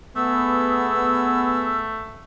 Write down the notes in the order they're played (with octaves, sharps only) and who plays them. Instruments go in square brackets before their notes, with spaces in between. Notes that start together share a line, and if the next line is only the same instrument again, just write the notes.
[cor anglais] A3 [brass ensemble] B3 G#4 [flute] E6